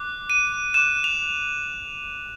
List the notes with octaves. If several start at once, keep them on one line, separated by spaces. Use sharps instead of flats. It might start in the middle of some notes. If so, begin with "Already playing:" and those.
Already playing: D6 F#6
D#7
D6 F#6 E7
F7